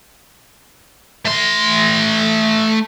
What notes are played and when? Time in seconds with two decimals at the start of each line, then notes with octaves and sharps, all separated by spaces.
1.25 A3 C6